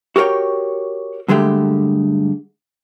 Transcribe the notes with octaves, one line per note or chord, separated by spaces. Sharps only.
F#4 G4 A#4 C#5 G5
G2 D3 G#3 A3 G4